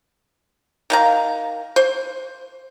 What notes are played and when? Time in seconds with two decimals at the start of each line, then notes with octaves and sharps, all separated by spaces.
0.90 D#3 F5 A#5
1.76 C5